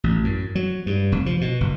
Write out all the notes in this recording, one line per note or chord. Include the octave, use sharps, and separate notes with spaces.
A1
F#2
F#3
G2
F1
F3
B2
F#1